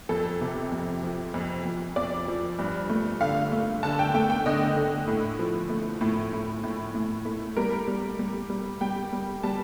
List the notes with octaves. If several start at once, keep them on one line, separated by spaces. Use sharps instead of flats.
F2 A4
C3
F2
F3
F2
F2
F2 D5
F3
G2
A3
D3 F5
A3
D3 A5
G5
A3 G5
G5
D3 D#5
D3
A2
F3
A3
A2
A2
A2
A2
A3
G3 A#4
G3
G3
G3
G3 G5
G3
G3 A5